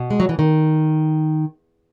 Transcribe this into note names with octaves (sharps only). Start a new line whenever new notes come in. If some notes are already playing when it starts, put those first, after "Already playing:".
Already playing: B2
G#3
F#3
E3
D#3